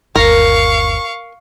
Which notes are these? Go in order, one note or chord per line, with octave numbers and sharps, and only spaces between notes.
G1 D#2 A#4 F5 C#6